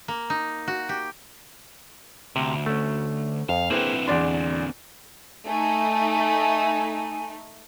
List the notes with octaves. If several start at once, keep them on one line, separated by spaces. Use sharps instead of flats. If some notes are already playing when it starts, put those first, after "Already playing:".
A#3
D#4
F#4
G4
D2 C3
A3 C#4
F2 F5
D3 A#3 C4 E4 G#4 B4 C5 G5
E2 D4 D5 C6
A3 D#4 G#5